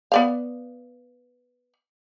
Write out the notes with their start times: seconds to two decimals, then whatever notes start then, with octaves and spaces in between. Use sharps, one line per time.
0.12 B3 D5 F5